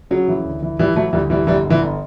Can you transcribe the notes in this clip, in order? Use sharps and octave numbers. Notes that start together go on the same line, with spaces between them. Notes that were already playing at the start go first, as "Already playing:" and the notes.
C#3 F#3
E3
D2
E3
E3 G3
E3 F#3 A3
D2 E3 G3
E3 G3
G1 E3 G3
D3
E3
G1